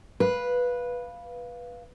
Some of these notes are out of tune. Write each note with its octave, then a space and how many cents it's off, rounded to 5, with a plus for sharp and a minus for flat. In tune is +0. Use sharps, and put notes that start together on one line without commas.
B4 -10 F5 +0